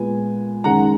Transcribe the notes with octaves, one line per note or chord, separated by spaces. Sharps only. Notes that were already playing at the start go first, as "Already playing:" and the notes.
Already playing: A#2 G#3 B3 G#5
F#2 D#3 G#3 C#4 F#5 A#5